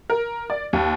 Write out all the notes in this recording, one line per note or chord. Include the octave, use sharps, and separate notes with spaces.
A#4
D5
D#2